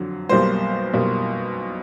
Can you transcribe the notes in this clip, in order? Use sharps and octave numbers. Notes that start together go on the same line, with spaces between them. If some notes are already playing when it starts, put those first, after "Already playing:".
Already playing: F2 D3 F#3
B1 B2 G3 A#3 C5
B1 B2 G3 A#3